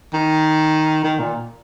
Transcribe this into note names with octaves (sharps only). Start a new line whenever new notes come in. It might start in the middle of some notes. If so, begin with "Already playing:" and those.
D#3
D#3
A#2